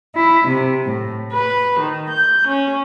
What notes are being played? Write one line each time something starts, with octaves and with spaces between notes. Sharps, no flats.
E4
C3
A2
B4
D#3
G6
C#4